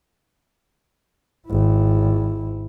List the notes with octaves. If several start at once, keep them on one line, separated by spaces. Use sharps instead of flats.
G#1 E4